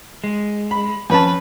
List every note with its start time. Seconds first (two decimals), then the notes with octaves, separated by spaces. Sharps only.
0.24 G#3
0.71 B5
1.10 F2 C#4 B4 A5